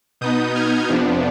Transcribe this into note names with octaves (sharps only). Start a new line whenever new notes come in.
B2 B3 D#4 D#6 G6
F6 G#6
F2 C3 F3 B3 D4